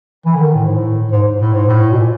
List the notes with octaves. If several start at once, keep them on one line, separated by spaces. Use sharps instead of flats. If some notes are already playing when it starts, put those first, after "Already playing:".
E3
D3
D#3
A2
G#2
A2
G#2
A2
G#2
A2
B2
A#2